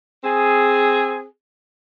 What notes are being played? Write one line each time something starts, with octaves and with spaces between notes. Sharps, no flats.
C4 G#4